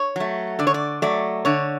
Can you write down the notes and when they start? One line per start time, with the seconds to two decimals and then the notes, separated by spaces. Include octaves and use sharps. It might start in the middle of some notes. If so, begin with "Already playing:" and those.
Already playing: C#5
0.16 F#3 A3
0.59 D3 D5
0.67 C#5
0.74 D5
1.02 F#3 A3 D5
1.45 D3 C#5